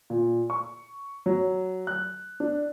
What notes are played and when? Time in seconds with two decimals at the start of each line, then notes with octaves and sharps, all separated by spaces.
0.10 A#2
0.50 C#6
1.26 F#3
1.87 F#6
2.40 D4